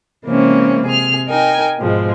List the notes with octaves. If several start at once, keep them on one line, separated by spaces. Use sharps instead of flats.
C3 E3 G#3 A#3 C4 C#4
C3 G#4 F6
D#4 A#4 G5 G#5
G#2 B2 F3 G#3